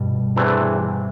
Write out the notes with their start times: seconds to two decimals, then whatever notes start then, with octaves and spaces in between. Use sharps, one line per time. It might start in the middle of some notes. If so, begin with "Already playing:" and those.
Already playing: G2 B2
0.36 E2 C3 E3 A3 D4